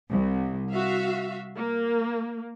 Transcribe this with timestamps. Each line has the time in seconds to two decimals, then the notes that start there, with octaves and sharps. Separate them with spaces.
0.11 C2
0.71 F#4 E5 F5
1.56 A#3